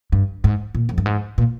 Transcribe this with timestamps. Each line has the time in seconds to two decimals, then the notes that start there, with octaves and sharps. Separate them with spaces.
0.12 G2
0.44 G#2
0.75 A#2
0.89 F2
0.98 G2
1.06 G#2
1.38 A#2